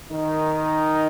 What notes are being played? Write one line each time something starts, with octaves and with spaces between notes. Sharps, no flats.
D#3 D#4